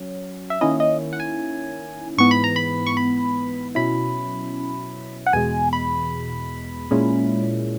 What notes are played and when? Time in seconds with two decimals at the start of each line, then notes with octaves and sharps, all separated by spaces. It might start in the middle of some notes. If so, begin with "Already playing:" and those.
Already playing: F#3 C#4
0.50 E5
0.61 D#3 A#3 C#4 E4 D#5
0.80 D#5
1.13 F#5
1.20 G#5
2.18 G#2 E3 B3 C#6
2.31 B5
2.44 A#5
2.56 B5
2.86 C#6
2.97 B5
3.75 B2 F#3 C#4 E4 B5
5.26 F#5
5.33 E2 B2 G#3 G#5
5.73 B5
6.91 A#2 G#3 C#4 E4